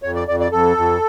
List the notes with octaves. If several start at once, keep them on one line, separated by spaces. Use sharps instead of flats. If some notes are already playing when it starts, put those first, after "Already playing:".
F2 C#5
D5
F2 D5
D5
F2 A4
F2